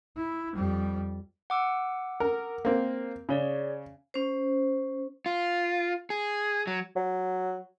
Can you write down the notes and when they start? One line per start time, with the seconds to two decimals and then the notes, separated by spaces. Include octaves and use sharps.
0.16 E4
0.55 F2 G3
1.50 F#5 D6 E6
2.20 A#4
2.65 A#3 C4
3.29 C#3 G#4 C#5 D5
4.14 C#4 C5
5.26 F4
6.10 G#4
6.67 F#3
6.96 F#3